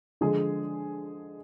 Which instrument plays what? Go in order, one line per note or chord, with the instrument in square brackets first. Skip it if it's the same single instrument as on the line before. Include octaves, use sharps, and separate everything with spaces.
[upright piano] D3 F3 G#3 G#4